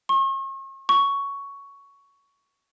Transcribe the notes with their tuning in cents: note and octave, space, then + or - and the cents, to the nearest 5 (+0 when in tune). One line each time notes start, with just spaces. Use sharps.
C#6 -40
C#6 +10